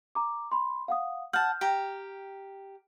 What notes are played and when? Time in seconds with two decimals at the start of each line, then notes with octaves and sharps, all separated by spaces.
0.15 A#5 D6
0.52 B5 C6
0.88 F5 F#5 D#6
1.33 F#5 A5 F6 G6
1.61 G4 G5 A#5